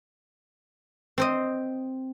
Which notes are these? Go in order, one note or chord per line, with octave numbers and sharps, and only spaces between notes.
C4 C5 D#5